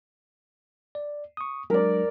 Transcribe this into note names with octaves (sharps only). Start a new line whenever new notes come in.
D5
C#6 D#6
F#3 G#3 D4 A#4 D5